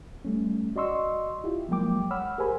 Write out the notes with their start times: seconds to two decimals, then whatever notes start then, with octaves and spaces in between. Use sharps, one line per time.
0.25 G3 A3 C#4
0.76 F#4 D5 D#5 C6 C#6 E6
1.44 E4 F4 G4
1.69 F3 F#3 G#3 A#3 G5 D6
2.11 C#5 F#5 B5 E6 F6
2.38 G4 G#4 A#4 C5 G#5 B5